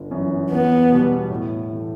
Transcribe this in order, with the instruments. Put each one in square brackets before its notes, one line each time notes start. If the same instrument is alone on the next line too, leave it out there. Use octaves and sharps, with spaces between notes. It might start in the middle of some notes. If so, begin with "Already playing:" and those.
Already playing: [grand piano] G1
F#2 E3
[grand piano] E2 [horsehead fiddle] B3
[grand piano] B2 G3
A2
E3 A3